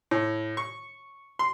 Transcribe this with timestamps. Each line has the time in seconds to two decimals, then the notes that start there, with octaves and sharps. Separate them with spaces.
0.11 A2
0.57 C#6
1.39 C6